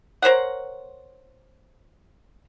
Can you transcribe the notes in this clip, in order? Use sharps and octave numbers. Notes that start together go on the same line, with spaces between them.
A#4 C5 C#5 F#5